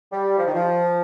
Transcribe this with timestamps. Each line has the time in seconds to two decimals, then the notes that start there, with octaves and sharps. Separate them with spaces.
0.12 G3
0.38 F3
0.47 D#3
0.54 F3